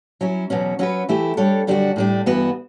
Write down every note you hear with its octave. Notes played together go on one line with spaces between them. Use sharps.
F#3 C#4 E4
E2 B2 F#3 C#4
F#3 C#4 F#4 B4
E3 A3 E4 G4
G3 D4 A4 C#5
F#2 D3 G3 D4 F#4
A2 G3 D4
G2 E3 B3 F#4 B4